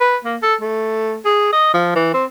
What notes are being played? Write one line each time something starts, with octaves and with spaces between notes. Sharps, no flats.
B4
A#3
A4
A3
G#4
D#5
F3
E3
C4